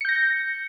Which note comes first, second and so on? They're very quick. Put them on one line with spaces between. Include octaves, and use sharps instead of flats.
C#7 G6 A#6